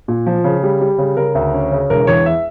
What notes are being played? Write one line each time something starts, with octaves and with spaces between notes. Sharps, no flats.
A#2
F3
C#3
G3
G3
C#3
C#3 A#4
D2
C#4
C#3
E1 A#4
E2 C#5
E5